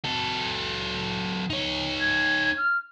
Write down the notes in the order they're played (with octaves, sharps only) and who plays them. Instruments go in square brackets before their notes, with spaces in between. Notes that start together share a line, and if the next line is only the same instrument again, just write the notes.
[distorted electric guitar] F#3 A4
D#4 C#5
[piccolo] G#6
F6